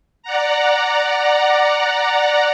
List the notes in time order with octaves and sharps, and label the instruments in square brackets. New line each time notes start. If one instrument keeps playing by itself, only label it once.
[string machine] D5 F#5 A#5